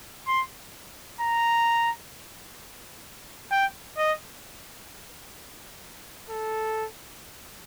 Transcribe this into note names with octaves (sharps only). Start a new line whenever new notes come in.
C6
A#5
G5
D#5
A4